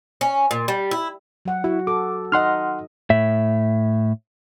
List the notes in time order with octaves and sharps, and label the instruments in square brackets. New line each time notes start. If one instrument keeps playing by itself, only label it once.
[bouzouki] C#4
A#2
G3
E4
[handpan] F#3 F#5
[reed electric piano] E4 [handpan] F#4
[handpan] A4 [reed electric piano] D6
[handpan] D#4 D#5 [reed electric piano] F#5 C6 F6
[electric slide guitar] A2 E5